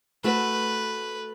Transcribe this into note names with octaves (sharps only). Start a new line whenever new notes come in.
A3 F#4 A4 B4